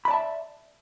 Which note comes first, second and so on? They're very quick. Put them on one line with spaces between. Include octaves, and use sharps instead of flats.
B5 D5 A5 E5